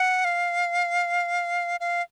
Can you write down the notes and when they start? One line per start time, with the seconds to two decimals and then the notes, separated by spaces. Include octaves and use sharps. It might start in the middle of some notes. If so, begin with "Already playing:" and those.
Already playing: F#5
0.25 F5
1.80 F5